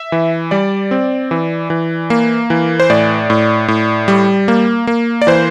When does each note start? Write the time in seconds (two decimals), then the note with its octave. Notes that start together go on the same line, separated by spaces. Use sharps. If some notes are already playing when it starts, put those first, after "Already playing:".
Already playing: E5
0.12 E3
0.51 G3 D5
0.91 C4
1.31 E3
1.70 E3
2.10 A#3
2.50 E3
2.80 C5
2.90 A2 D5
3.30 A2
3.68 A2
4.08 G3
4.48 A#3
4.87 A#3
5.22 D5
5.27 E3 C5